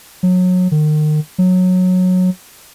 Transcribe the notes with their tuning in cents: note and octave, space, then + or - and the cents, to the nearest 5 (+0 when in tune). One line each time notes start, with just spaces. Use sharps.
F#3 -25
D#3 -35
F#3 -15